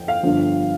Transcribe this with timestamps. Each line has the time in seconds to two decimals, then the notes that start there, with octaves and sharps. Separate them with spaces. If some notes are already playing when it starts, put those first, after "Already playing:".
Already playing: F2 G5
0.08 F5
0.23 G1 G2 D3 F3